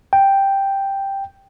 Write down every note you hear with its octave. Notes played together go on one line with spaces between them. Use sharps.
G5